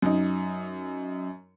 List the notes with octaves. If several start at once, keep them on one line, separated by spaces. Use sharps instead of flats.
F#2 D#4